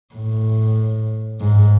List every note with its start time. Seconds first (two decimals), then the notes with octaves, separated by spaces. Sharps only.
0.15 A2
1.41 G#2